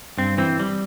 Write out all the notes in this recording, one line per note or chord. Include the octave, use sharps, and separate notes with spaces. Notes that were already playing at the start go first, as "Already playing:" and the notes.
G2 C4
E3 C4
G3